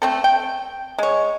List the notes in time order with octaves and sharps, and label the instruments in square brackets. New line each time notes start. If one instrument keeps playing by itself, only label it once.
[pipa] A3 C4 A4
G5
G#3 C#5